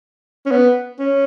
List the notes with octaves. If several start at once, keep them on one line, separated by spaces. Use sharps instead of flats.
C#4
B3
C#4